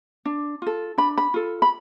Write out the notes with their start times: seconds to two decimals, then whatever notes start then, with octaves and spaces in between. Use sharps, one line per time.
0.25 D4
0.62 F4 A4
0.98 D4 B5
1.18 B5
1.34 F4 A4
1.62 B5